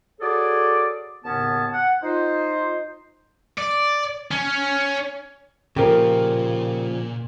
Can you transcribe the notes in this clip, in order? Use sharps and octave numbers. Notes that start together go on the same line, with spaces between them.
F#4 G#4 A4 C#5 D5
D#2 A2 C#3 B3 C#4 A5
F#5
D#4 F4 C5
D5
C#4
A#2 C#3 F3 G4 A#4